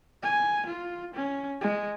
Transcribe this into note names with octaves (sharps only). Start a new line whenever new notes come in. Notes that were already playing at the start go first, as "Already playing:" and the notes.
G#5
F4
C#4
G#3